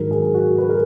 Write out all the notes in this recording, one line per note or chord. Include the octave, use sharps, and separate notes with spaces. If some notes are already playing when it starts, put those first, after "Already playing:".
Already playing: G#2 D#3 F#3 A#4
G#4
F#4
B4
A#4